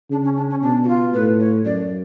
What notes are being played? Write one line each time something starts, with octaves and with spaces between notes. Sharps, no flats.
C#3 D4
C#4
D4
C#4
B2 D4
F#4
F4
A2 B4
C#5
F#2 D5